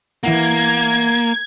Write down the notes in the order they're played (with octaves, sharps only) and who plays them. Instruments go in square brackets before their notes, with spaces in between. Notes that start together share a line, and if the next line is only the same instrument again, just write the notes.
[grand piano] E3 E4 F#5 [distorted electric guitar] A#3 [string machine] G#6